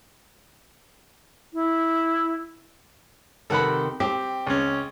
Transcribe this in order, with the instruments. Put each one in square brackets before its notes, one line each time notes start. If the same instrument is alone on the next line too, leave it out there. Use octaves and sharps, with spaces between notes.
[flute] E4
[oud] C3 D#3 B3 [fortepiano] A4 F#5 B5
[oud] C4 [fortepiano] G4
[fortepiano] C#2 C#4